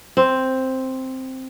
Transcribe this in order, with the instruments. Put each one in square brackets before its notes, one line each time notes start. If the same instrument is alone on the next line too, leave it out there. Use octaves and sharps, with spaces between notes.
[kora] C4